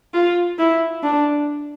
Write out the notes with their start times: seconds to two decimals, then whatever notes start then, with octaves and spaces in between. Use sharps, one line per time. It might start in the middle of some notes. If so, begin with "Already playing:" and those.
0.14 F4
0.59 E4
1.04 D4